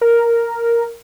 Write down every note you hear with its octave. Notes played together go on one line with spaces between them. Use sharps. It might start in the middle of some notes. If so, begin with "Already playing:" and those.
A#4